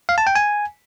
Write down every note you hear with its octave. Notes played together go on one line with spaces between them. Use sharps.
F5
A5
G5
G#5